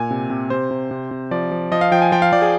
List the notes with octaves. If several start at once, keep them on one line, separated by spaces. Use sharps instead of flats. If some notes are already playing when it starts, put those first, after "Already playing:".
Already playing: A#2 G#5
C3
C3
C3 C5
C3
C3
C3
F3 D5
F3
F3 D#5
F5
F3 G5
G#5
F3 G5
F5
F3 D5
G#4